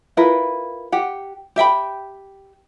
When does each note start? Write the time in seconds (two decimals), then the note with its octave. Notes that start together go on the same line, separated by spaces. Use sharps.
0.17 E4 F4 A#4 B4
0.92 G4 F#5
1.56 G4 E5 G5 B5